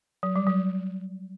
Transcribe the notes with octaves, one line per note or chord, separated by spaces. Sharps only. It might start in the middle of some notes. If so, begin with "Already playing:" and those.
F#3
G3
F#3